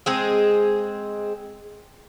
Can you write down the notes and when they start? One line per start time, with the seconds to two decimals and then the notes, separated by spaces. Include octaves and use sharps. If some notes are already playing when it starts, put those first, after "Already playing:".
0.06 G#3 C4 G#4